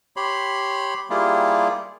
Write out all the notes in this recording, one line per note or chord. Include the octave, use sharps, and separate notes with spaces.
G4 C#5 B5 C6
G3 A#3 E4 F4 G4 G#4